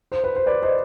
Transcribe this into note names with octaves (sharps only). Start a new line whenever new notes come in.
C5
B4
C5
B4 D5
C5 D#5